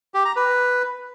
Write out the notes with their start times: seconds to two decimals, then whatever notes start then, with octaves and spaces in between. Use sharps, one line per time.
0.14 G4
0.25 A#5
0.36 B4